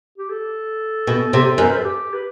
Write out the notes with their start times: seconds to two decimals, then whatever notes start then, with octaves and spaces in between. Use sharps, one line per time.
0.18 G4
0.30 A4
1.07 B2
1.33 C3
1.58 F#2
1.62 C5
1.70 B4
1.76 A4
1.84 G4
2.13 B4